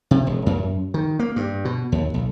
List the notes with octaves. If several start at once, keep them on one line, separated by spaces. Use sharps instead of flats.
C3
E1
F#2
D#3
A#3
G2
B2
D#2
B1